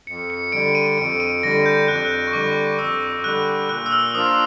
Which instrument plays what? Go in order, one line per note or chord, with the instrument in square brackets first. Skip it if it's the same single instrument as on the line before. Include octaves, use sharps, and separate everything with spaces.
[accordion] F2 [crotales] C#7
[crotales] C#7
[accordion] D3 G3 [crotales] D7
[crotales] D#7
[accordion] F2 [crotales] D7
[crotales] D#7
[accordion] D3 G3 [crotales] A#6
[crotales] G6
[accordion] F2 [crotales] F#6
[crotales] G6
F#6
C#6
[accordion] D3 G3 [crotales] D6
[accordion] F2 [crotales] E6
[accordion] D3 G3 [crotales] F#6
[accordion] A#2 [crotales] F#6
[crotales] E6
F6
[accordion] F3 A#3 D4 F4 [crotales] D#6